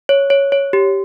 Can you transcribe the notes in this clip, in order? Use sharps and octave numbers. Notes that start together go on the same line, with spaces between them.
C#5
C#5
C#5
G4